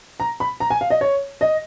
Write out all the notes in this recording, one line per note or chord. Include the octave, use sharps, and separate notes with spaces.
A#5
B5
A#5
G#5
F5
D#5
C#5
D#5